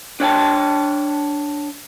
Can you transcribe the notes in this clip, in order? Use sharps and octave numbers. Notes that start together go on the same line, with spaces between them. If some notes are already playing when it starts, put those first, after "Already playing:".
D4 C#5 G5 A5